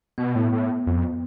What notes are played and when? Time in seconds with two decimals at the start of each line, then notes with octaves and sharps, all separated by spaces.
0.18 B2 B3
0.35 A2
0.52 A2
0.87 F2